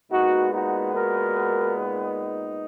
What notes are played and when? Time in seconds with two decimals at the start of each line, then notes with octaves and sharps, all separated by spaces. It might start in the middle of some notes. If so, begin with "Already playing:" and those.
0.11 A#2 G#3 B3 D#4 F#4
0.52 D#4 F#4
0.94 F#4 A#4
1.77 D#4